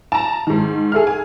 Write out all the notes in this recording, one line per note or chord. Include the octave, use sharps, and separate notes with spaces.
A5 A#5
G#2 D#3
G#4 A4 E5 F6
G#5